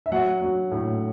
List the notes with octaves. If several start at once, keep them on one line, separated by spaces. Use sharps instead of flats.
E5
F#3 F#5
F#3
A2